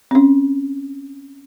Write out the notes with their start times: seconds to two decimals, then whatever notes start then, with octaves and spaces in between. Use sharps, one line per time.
0.11 C4 C#4